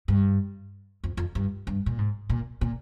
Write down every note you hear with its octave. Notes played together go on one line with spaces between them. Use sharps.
G2
F2
F2
G2
G2
A#2
G#2
A#2
A#2